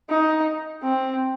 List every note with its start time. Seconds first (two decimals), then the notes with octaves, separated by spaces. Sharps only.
0.10 D#4
0.82 C4